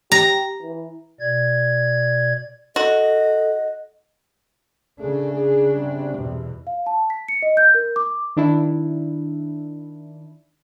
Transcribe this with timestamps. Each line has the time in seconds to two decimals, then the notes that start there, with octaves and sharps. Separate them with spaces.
0.12 G4 A#5
0.62 E3
1.20 B2 D5 G#6
2.76 F#4 A4 D#5
4.99 C#3 A3 D4 G#4
5.34 G#4
5.75 C3 G3
6.17 E2 B2
6.67 F5
6.86 A5
7.10 B6
7.28 C#7
7.42 D#5
7.57 G6
7.74 A#4
7.96 D6
8.36 D#3 D4 E4